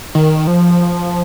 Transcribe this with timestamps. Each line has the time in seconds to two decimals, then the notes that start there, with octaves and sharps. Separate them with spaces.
0.15 D#3
0.47 F3